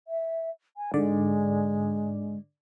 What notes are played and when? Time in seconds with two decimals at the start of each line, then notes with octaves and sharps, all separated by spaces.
0.08 E5
0.77 G#5
0.94 G#2 D3 G#3 D5